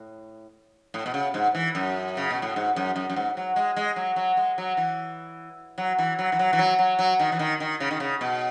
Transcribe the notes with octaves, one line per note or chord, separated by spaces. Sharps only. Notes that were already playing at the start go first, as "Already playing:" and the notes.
Already playing: A2
A2
B2
C#3
G#2
E3
F#2
C#3
B2
A2
G#2
F#2
F#2
F#2
G#2
F#3
G#3
G#3
F#3
F#3
G#3
F#3
E3
F#3
E3
F#3
E3
F#3
E3
F#3
F#3
F#3
D#3
E3
D#3
D#3
C#3
D#3
C#3
B2